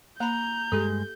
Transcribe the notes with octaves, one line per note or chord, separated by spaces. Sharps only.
A#3 A#5 B5 G6
G2 G#3 G4 A4